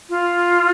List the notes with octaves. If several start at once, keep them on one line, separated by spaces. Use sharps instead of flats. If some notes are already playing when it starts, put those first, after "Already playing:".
F4